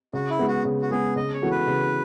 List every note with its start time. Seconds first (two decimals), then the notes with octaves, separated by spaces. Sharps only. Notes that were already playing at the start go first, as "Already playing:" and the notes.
0.13 C#3 F#4
0.30 E4
0.39 G#3 B3
0.48 F#4
0.65 C#3
0.82 F#4
0.91 G#3 B3 G#4
1.16 C#3 D#5
1.33 C#5
1.42 E3 B3 F#4 A4
1.51 B4
1.67 C#3